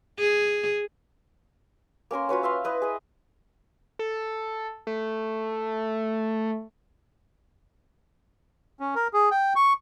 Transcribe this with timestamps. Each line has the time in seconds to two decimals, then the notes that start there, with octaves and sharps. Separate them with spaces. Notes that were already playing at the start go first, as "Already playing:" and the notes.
0.19 G#4
2.11 A#3 C#4 A#4 C6
2.29 F4 F#4 B4 C#5
2.43 E5 F5 C6
2.64 E4 B4 D#5
2.82 G#4 D#5 E5
3.99 A4
4.87 A3
8.80 C#4
8.95 A#4
9.13 G#4
9.31 G5
9.56 C#6